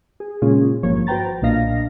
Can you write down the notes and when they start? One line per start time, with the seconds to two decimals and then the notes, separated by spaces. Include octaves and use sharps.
0.20 G#4
0.42 A#2 C#3 G#3 C#4 F4 G#4
0.83 G#1 G2 F3 A#3 C#5
1.07 F#4 B4 C5 G5 A#5 A6
1.42 B1 A#2 D4 D#5 F5 A#6